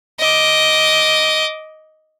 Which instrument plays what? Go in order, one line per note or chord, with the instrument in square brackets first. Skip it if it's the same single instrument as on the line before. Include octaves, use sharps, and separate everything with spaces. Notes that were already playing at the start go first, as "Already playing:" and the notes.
[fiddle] D#5 D6